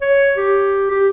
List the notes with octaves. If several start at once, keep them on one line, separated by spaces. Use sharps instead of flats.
C#5
G4
G4